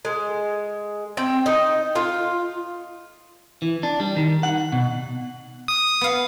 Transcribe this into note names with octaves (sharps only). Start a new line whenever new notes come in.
G#3
C4 G5
D#4
F4
E3
D4
G3
D#3
F#5
B2
D#6
B3 F5